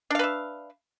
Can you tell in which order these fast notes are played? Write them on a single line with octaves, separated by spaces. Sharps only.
D4 F5 B4 E5